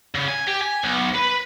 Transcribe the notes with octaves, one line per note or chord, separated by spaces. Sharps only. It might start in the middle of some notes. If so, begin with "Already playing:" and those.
C#3
G#5
G4
G#5
B1
B4